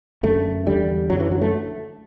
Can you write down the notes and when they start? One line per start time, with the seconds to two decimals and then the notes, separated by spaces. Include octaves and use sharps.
0.23 F#2 D3 A3
0.66 E2 D3 G3
1.10 F#2 D3 F#3
1.20 E3
1.31 F#3
1.41 A3